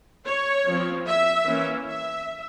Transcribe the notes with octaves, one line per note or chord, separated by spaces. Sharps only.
C#5
F3 C4
E5
E3 A#3 C#4
E5